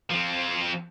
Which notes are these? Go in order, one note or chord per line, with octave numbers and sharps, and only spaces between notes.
F3 C4